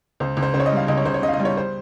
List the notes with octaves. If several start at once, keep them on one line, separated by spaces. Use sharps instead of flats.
C#2 C5
C#2
C5
C#3 C5
C#5
D#5
G3 F5
C#2 D#5
C#5
C#2 C5
C#5
C#3 D#5
F5
D#5
G3
C#5
C5